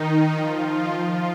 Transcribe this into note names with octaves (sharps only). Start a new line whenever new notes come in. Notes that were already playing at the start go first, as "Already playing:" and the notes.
Already playing: D#3 D#4
F3 F4
F3 F4
F3 F4